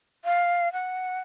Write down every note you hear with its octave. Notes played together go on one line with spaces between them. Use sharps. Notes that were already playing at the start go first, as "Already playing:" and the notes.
F5
F#5